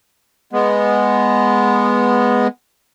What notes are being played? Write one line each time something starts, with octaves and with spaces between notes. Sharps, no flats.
G#3 B3